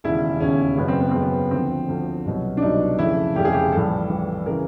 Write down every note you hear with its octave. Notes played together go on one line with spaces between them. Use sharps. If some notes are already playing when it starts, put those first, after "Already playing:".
E1 D#2 C#3 E4
E1 D#2 C#3 C#4
F#1 F#2 C#3 B3
C4
B3
F#1 F#2 C#3 C4
B3
D2 D3 F3 C4
D2 D3 F3
C2 B2 F#3
D4
C2 B2 F#3 D#4
F1 F2 C#3 E4
F1 F2 C#3 G4
G#4
G4
A#1 A2 E3 G3 A4
A#1 A2 E3 G3
C#3 E3 A#4